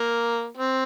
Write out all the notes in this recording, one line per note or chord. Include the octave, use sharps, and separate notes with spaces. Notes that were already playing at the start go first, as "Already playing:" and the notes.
Already playing: A#3
C4